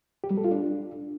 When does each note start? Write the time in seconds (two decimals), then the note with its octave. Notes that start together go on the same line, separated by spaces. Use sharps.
0.24 G4
0.31 G3
0.37 A4
0.44 F4
0.51 D4